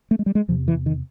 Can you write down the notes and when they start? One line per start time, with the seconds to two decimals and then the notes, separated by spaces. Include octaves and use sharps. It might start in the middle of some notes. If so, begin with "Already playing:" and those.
0.11 A3
0.19 G#3
0.26 G3
0.35 G#3
0.48 E2 C3 F3
0.68 E3
0.86 D#3